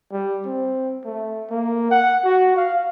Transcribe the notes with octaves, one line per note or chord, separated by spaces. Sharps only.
G3
C4
A3
A#3
F#5
F#4
F5